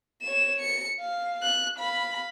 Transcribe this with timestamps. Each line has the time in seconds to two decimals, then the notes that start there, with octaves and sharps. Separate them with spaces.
0.22 C#5 E7
0.60 C#7
1.01 F5
1.43 F#6
1.76 F5 B5